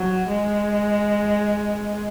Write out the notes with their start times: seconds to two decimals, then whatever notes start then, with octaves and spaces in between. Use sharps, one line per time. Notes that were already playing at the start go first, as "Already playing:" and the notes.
Already playing: F#3
0.27 G#3